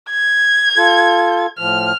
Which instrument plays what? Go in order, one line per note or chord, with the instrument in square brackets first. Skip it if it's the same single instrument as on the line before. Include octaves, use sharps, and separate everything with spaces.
[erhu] G#6
[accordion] F4 A4
[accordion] A2 F3 [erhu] F6